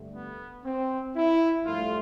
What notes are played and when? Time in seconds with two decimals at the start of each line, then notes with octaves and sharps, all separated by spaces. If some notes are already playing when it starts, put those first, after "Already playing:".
Already playing: G2 D3 A3
0.15 B3
0.65 C4
1.15 E4
1.65 G2 F3 A3 F4